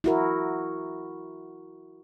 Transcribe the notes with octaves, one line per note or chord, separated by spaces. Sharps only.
E4 F#4 A#4